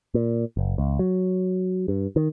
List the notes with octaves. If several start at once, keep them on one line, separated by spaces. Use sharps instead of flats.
A#2
F#1
C#2
F#3
G2
D#3